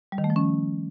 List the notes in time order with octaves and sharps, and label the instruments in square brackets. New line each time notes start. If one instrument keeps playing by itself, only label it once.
[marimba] G3
D#3
A3
F3
C#4